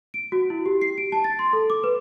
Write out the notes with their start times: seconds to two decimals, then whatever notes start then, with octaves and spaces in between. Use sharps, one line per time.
0.14 D7
0.32 F#4
0.50 E4
0.66 G4
0.81 C7
0.98 D7
1.12 A5
1.24 A6
1.39 C6
1.53 A4
1.70 D6
1.84 B4